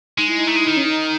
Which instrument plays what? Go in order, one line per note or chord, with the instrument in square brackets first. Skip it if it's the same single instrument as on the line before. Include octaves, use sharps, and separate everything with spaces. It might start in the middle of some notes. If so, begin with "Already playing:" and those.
[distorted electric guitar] G#3 [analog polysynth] D#4
[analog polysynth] E4
D#4
[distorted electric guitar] A3
G#3
D#3
[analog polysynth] C#4
D#4
D#4